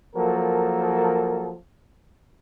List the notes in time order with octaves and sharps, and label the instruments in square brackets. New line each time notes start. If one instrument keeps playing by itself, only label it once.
[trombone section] F3 F#3 A#3 A4 A#4